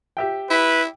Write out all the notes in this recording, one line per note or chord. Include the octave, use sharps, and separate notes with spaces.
G4 E5 G5
E4 B4